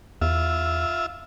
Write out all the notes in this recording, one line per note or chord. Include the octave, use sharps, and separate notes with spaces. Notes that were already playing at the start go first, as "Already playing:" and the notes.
E2 F4 E5